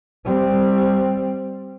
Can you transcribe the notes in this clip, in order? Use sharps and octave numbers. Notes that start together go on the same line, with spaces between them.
G3 C4